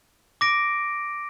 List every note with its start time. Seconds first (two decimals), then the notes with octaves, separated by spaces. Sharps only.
0.41 D6 A#6 D7